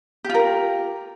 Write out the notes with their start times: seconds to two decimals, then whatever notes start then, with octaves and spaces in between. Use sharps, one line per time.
0.24 G4
0.29 F4
0.34 A#4